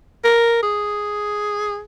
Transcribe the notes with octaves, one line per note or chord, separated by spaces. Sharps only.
A#4
G#4